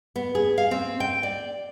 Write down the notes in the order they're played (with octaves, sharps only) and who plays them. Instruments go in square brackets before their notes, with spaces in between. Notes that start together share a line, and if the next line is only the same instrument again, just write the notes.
[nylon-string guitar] B3
G#4
F5
C4
G5
D5